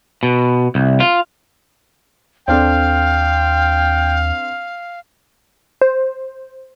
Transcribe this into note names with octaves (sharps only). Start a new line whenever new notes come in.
B2
C2
F4
D#2 C4 D4 A4 F5 G5
C5